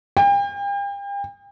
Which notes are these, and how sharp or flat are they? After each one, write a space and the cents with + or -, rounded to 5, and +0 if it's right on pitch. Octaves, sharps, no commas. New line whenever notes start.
G5 +40